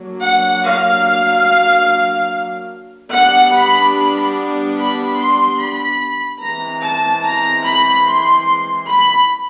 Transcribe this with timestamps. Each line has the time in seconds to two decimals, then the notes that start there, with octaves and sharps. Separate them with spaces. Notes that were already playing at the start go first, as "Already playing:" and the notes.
Already playing: F#3 A#3 D4
0.23 F#5
0.64 F5
3.11 G3 B3 D4 F#5
3.52 B5
3.93 B5
4.76 B5
5.17 C6
5.59 B5
6.40 E3 G#3 C4 A#5
6.82 A5
7.23 A#5
7.64 B5
8.05 C6
8.87 B5